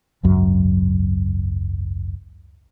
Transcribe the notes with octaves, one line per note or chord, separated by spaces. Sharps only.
G#1 C#2 F#2 F#3